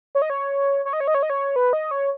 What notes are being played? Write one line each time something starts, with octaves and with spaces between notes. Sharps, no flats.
C#5
D#5
C#5
C#5
D#5
C#5
D#5
C#5
D#5
C#5
B4
D#5
C#5